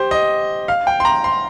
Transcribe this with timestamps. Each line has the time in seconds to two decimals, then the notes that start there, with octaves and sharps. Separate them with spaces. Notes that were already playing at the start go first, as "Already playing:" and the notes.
Already playing: G4 C5
0.11 D#5
0.68 F5
0.87 G5
1.00 C6
1.05 A#5
1.24 C6